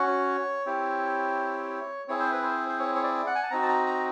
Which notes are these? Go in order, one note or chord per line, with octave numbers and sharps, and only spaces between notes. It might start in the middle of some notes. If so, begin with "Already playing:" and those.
Already playing: C#4 F#4 C#5
C4 E4 G4
C4 E4 G#4 C#5
C5
B4
C5
C5
C#5
C#5
D5
F#5
G#5
A5
C4 D#4 F#4 A#5
A5
A#5
A#5